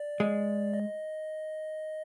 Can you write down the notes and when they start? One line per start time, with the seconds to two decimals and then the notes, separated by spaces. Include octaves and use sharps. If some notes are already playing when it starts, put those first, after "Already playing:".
Already playing: D5
0.20 G#3
0.74 D#5